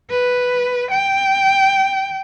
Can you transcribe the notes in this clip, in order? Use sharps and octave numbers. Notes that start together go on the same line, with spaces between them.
B4
G5